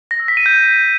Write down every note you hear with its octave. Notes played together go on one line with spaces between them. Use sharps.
A#6
E6
B6
D#7
G6